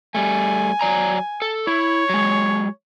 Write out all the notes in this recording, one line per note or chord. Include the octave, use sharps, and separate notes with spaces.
G3 A3 G#5
F#3 D5 A#5
A4
E4 C#5
F#3 G#3